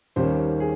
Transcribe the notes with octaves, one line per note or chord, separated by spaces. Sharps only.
D#2 D#3 G3 A#3 C#4 C5
G#4